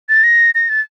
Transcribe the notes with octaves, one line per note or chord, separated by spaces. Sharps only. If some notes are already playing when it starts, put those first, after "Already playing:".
A6
A#6
A#6
A6